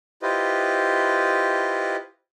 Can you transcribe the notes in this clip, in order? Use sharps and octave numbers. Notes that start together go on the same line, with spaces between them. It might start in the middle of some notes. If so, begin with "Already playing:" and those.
E4 F4 G4 B4 C5 D#5